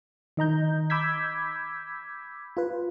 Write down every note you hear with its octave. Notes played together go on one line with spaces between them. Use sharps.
D#3 D#5 A#5 G6
B5 D6 E6 G6 G#6 B6
F4 B4